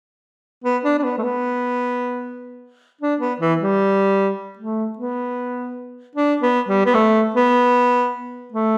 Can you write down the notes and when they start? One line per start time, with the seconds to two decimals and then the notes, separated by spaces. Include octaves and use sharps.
0.64 B3
0.85 D4
0.99 D4
1.04 B3
1.18 A3
1.23 B3
3.01 D4
3.20 B3
3.40 E3
3.61 G3
4.59 A3
4.99 B3
6.16 D4
6.42 B3
6.68 G3
6.86 B3
6.95 A3
7.35 B3
8.52 A3